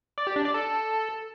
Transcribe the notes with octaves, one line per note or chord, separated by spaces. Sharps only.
D5
G4
D4
D5
A4